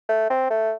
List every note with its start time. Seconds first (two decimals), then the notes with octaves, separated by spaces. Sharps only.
0.09 A3
0.30 C4
0.50 A3